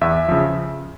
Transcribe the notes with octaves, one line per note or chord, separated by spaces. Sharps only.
E2 E5
C#3 F3